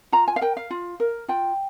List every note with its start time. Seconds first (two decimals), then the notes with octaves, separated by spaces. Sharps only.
0.12 F4 A#5
0.28 G#5
0.36 F5
0.41 A#4 G5
0.57 F5
0.70 F4
1.00 A#4
1.28 F4 G5